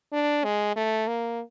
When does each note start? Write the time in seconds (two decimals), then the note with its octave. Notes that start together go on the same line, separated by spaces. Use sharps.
0.13 D4
0.44 G#3
0.76 A3
1.08 A#3